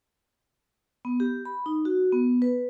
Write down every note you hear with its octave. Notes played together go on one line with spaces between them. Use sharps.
B3
G4
B5
D#4
F#4
B3
B4